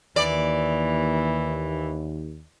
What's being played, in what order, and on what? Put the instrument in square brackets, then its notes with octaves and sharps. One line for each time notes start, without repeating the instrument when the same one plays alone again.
[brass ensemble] D#2 [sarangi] E3 [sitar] D5